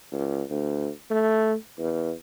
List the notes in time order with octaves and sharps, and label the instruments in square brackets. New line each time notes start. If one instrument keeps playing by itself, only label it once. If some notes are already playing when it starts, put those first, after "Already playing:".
[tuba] C#2
D2
A3
E2